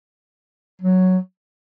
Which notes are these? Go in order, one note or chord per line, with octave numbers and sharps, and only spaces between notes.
F#3